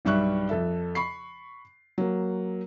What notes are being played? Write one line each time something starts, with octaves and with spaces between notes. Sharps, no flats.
B1 G2 G3 E5 C#6 F#6
F2 A4 E5
B5 C#6 C7
F#3 A#3